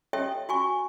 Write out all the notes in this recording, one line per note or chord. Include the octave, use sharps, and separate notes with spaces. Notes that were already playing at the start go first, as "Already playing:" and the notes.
G4 A4 C#5 D#5 E5 G5
F#4 G#5 C#6